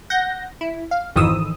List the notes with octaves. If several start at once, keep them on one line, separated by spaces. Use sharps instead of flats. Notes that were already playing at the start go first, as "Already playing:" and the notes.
F#5 G6 A#6
E4
F5
G#1 F2 D#3 E3 D#6 E6